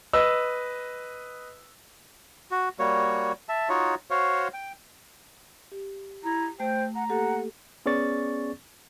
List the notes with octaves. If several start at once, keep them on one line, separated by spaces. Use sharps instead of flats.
B4 D#5 E6
F#4
G3 A#3 F#4 C#5
E5 A5
D#4 F4 F#4 C#5
F#4 C5 C#5 F5
G5
G4
E4 A#5
A3 C5 G5
F#5 A#5
A#3 G4 A4 F#5
B3 C#4 G#4 D5 C#6 A6